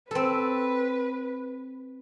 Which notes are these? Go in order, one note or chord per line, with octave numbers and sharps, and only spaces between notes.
C4 A4 B4